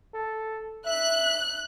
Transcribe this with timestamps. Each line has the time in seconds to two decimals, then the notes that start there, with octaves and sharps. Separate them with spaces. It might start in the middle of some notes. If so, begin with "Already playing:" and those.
0.14 A4
0.86 E5 F#6